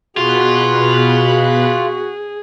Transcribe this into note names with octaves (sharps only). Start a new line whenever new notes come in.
B2 F4 F#4 G#4 B5 F#6